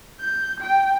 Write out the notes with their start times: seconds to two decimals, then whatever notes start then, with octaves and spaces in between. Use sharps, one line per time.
0.20 G6
0.61 G5